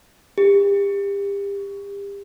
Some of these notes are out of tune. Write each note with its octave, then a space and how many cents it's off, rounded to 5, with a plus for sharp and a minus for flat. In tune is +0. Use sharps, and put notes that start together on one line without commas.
G4 +35